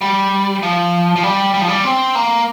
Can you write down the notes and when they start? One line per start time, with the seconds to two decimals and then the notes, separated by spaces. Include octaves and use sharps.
0.01 G3
0.63 F3
1.16 F3
1.23 G3
1.54 G3
1.61 F3
1.68 G3
1.85 C4
2.15 A#3